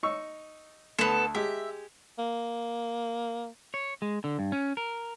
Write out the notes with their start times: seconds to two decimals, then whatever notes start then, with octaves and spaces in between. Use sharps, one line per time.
0.03 D#4 C#6 E6
0.99 D2 B3 A4
1.35 G#3 G4 E5
2.19 A#3
3.74 C#5
4.02 G#3
4.24 D3
4.39 G2
4.52 C#4
4.77 A#4